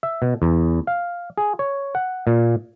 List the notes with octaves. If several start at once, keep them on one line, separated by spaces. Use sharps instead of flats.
E5
B2
E2
F5
G#4
C#5
F#5
A#2